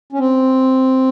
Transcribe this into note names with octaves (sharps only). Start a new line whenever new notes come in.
C#4
C4